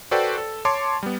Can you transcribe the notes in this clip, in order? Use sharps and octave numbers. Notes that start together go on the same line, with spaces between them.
F#4 A4 B4 C5 D5 G5
A4
C#5 A5 C6 D6
G3 B3